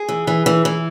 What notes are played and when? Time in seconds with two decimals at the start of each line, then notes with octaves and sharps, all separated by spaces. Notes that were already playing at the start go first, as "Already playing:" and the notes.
Already playing: G#4
0.09 E3
0.27 E3
0.46 E3
0.65 E3